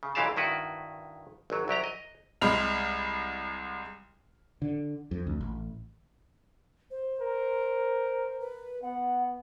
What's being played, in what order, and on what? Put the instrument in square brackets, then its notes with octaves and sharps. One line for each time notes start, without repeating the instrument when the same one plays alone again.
[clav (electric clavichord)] C#3
B1 A#2 E3 G4 F5 A5
G2 D#3 E4 F#4 B4
G#1 F#3
C2 F#3 G4 A#5
D#5
[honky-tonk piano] C2 G#3 B5 F6 F7
[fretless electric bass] D3
F2
D2
A1
[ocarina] C5
[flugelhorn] A#4
[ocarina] B4
[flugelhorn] B3 [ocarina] F#5